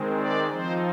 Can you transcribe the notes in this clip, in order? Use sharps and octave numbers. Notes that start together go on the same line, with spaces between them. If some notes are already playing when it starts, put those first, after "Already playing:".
Already playing: D#3 G#3 C4
D5
F3 C4 D#4 C5